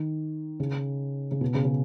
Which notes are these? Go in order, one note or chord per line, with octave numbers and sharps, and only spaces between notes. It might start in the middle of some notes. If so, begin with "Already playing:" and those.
Already playing: D#3
C#3
C#3
B2
C#3
C#3